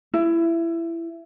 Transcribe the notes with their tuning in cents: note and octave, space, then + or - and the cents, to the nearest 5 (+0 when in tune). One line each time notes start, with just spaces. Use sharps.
E4 +20